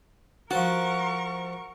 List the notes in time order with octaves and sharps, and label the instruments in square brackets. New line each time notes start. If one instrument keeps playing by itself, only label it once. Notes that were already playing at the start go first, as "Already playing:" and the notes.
[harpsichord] F3 C5 A5 [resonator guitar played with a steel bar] F#4 [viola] A#4 C#6